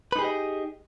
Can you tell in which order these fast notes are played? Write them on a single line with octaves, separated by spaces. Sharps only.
B4 D#4 G#4 G4 D#5